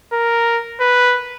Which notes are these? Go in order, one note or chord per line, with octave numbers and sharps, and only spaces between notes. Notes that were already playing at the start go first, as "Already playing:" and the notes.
A#4
B4